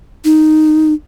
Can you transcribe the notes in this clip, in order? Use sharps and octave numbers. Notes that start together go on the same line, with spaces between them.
D#4